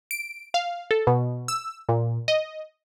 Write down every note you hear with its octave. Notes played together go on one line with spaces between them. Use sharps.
D7
F5
A4
B2
E6
A#2
D#5